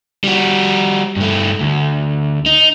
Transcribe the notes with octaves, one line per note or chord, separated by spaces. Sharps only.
G3 F#4
G2 A3
D2
D#4